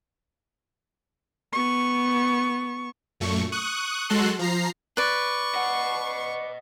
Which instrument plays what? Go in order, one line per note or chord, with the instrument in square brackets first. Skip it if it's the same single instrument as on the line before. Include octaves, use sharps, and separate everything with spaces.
[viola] B3 C#6
[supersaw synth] F#2 A#2 A3 C#6
C#6 D#6 F#6
F#3 G#3 F#4 A4 C6 F#6
F3 A#5 C7
[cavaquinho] B4 D5 [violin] C#6
[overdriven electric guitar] D#5 F#5